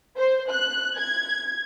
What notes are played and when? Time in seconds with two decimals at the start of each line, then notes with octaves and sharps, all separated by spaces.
0.16 C5
0.50 F#6
0.97 G#6